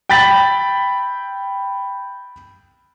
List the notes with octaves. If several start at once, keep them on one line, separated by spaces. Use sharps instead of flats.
G5 B5 A6 B6 F#7